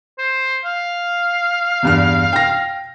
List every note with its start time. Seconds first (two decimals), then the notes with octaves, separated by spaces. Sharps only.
0.18 C5
0.65 F5
1.83 E2 G2 F6
2.33 G5 A#6